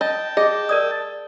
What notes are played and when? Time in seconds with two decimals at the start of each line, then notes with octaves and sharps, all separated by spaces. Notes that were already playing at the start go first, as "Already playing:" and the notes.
0.01 D#5 G5 A5
0.37 G#4 D#5
0.69 A#4 D5 D#6